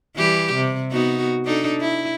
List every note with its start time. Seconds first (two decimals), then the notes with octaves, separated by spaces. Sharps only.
0.17 E3 G3 G4
0.55 C3
0.91 B3 D#4 F#4
1.45 D4 D#4 A4
1.81 E4